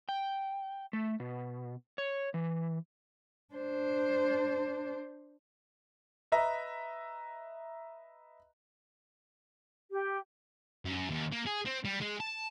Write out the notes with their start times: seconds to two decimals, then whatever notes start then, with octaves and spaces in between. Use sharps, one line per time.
0.09 G5
0.93 A3
1.20 B2
1.98 C#5
2.34 E3
3.54 D4 C5
6.32 B4 D#5 E5 A#5
9.92 G4
10.85 F#2
11.10 D#2
11.32 A#3
11.46 G#4
11.65 C4
11.85 G3
12.01 G#3
12.20 A5